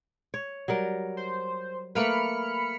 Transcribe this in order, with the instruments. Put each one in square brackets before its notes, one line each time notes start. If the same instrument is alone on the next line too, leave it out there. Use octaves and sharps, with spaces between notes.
[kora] C#5
F#3 G3 A#4
[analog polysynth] C5
[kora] A3 A#3 B4 [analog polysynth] B5 F6 C#7